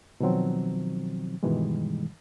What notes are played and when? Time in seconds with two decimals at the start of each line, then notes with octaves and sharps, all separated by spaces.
0.20 B2 D#3 F3 F#3 C4
1.43 G2 B2 D#3 E3 G3 G#3